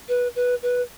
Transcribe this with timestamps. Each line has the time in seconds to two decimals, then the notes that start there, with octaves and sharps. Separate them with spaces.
0.09 B4
0.36 B4
0.62 B4